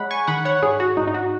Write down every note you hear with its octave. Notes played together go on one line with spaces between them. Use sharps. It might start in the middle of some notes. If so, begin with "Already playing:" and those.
Already playing: G#3 C#5 F#5 B5
G#5 C#6
D#3 F#5 B5
C#5 F#5
G#2 G#4 C#5
F#4
G#2 D#4
D#4
F#4